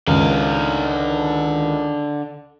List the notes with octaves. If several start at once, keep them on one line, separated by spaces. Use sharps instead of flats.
C#2 D3 D#3 F5